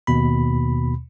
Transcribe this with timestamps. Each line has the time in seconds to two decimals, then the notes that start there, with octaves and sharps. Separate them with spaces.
0.07 D#2 B2 B5